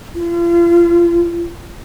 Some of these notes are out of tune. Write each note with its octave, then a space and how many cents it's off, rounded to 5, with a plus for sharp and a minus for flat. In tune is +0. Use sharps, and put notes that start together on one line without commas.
F4 -35